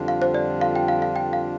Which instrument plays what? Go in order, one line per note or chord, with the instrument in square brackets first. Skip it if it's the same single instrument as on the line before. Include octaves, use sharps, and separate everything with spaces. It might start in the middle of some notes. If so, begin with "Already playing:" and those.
Already playing: [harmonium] F2 D3 G3 D4 F4
[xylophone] F5
C5
D5
F5
G5
F5
F5
G5
F5